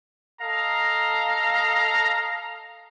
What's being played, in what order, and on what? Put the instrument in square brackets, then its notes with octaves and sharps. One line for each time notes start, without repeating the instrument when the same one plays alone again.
[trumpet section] A4 D#5 F5 A#5